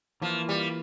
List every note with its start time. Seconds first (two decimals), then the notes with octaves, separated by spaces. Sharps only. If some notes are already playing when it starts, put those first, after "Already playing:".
0.22 E3 F3 A#3 F4
0.49 G3